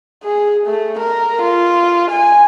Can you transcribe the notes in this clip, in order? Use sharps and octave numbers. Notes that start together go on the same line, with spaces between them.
G#4
A3
A#4
F4
G#5